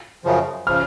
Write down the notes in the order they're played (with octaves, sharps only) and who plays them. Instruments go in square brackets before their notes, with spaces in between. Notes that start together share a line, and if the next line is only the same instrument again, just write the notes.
[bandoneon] F#2 C#3 F3
[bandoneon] C#3 F3 [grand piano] F6